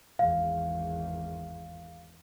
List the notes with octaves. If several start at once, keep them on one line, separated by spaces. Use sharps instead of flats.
G#1 E2 F5